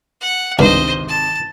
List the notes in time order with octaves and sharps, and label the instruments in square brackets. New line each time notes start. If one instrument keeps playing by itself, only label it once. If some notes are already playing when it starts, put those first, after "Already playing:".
[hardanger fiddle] F#5
[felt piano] G#1 C3 D#3 [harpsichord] C#2 G2 [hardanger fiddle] C5 D#5
[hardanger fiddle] A5